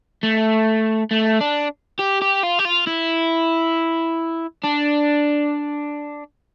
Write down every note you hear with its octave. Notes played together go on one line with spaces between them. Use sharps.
A3
A3
D4
G4
G4
F4
G4
F4
E4
D4